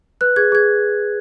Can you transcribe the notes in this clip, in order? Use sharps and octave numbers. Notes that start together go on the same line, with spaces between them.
B4 F#6
G#4 G#6
G#4 G#6